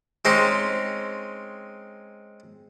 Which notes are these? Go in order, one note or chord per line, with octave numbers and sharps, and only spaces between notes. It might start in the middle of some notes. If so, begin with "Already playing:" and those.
G#3 C4 C#4 D#4